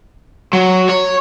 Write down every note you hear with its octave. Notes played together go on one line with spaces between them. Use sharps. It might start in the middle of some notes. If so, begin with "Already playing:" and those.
F#3
C#5